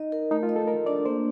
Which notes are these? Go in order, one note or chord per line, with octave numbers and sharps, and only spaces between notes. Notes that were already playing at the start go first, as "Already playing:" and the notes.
Already playing: D#4 D#5
A#4
A3 D#4
F4
D#5
A4
A4 A#4
D4 D5
A#3 C5